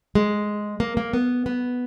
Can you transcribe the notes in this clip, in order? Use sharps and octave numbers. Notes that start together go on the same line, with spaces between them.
G#3
A#3
A#3
B3
B3